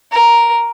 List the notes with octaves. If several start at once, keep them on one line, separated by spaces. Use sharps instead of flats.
A#4